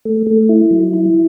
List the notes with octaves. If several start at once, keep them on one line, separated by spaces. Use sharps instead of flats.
A3
A3
E4
F#3
E4